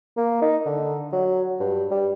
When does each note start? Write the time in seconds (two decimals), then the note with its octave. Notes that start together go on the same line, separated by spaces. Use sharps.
0.17 A#3
0.42 D#4
0.66 D3
1.13 F#3
1.60 G2
1.91 G3